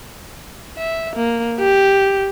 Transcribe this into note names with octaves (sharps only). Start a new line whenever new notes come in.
E5
A#3
G4